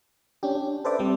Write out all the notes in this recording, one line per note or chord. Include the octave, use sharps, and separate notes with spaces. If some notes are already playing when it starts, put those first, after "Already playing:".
C#4 D4 G4
D4
A4 B4 C5 D5 E5 D6
G3 C4